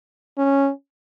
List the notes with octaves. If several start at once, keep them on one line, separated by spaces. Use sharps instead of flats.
C#4